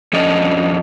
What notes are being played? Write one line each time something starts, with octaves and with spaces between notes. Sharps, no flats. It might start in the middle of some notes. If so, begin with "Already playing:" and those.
F2 C#4 D4 A4 D#5